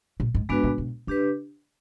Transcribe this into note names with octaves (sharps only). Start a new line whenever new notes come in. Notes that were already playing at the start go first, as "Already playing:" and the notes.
A#2
G#2
G#2 G#3 B3 D4 F#4 B4
A2
B2
C#3 D4 G4 B4